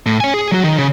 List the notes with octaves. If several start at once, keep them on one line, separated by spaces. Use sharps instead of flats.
A2
C#5 G#5
G#4
F#3 F#4
D#3
C#3